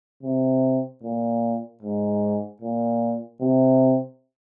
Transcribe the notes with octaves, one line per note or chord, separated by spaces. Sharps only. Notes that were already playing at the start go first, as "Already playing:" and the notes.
C3
A#2
G#2
A#2
C3